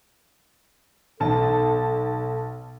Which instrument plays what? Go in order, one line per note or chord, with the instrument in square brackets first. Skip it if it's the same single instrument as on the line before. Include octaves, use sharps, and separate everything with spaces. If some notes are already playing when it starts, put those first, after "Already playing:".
[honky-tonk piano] B1 A5 [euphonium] A4